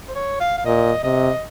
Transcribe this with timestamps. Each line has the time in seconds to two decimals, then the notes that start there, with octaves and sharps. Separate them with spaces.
0.09 C5
0.16 C#5
0.40 F5
0.58 F5
0.66 A#2 D#5
1.03 C3 D#5